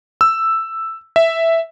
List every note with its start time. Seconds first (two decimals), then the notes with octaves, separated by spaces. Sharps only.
0.21 E6
1.16 E5